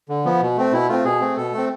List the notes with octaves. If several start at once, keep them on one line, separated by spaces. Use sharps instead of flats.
D3
F3 B3
B2
A3 C4
B2 E4
A3 C4 F4
B2 G#4
A3 C4
B2 A4
A3 C4